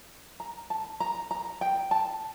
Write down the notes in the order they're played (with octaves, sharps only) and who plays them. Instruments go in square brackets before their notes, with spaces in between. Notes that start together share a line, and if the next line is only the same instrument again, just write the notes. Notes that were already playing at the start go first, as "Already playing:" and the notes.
[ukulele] A#5
A5
A#5
A#5
G5
A5